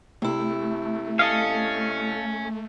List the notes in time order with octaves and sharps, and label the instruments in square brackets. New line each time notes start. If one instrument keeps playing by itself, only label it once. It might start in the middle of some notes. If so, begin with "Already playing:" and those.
[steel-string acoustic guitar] C3 E4 [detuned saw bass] A3
[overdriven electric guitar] C#4 [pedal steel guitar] A4 D#5 F5